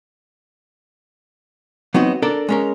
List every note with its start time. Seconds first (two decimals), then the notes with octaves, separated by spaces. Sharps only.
1.94 F#3 B3 C4 D#4 F#4
2.22 D4 A4 A#4 D5
2.49 G#3 C#4 A#4